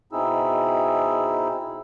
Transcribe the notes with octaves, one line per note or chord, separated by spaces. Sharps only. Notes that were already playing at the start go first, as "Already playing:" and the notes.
B2 C4 D#4 E4 G#4 E6